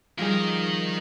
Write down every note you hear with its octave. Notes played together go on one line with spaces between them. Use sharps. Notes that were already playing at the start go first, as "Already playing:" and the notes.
D#3 F3 G3 G#4 A#4